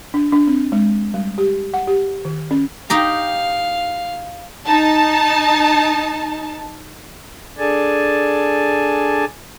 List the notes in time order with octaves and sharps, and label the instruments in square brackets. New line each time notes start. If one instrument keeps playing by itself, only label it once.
[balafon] D4
D4
C4
G#3
G3
G4
F#5
G4
D#3
C#4
[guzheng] D#4 G4 A#5 [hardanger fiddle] F5
[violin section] D#4 A5
[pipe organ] D4 G#4 A4 D5 G#5 A5